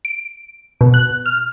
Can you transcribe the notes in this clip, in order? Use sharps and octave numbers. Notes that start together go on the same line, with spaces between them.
D7
B2
F#6
F6